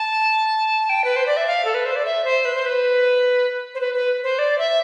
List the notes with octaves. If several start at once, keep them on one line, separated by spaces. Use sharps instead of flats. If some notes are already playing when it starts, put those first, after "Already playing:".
Already playing: A5
G5
B4
C5
D5
E5
F5
A4
B4
C5
D5
E5
C5
B4
C5
B4
C5
B4
B4
C5
D5
E5